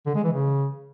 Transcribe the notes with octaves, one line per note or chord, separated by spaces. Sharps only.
D3
G#3
E3
C#3